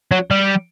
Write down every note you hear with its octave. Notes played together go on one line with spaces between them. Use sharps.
F#3
G3